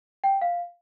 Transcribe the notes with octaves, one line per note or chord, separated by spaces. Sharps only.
G5
F5